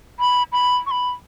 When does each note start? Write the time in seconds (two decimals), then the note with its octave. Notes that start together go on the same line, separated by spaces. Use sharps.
0.20 B5
0.52 B5
0.86 C#6
0.91 B5